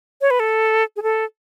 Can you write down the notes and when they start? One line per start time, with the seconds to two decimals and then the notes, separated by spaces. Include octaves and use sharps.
0.21 C#5
0.31 B4
0.40 A4
0.96 G#4
1.03 A4